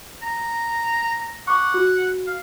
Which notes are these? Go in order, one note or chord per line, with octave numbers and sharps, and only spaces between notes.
A#5
F#5 C#6 D6
F#4
F5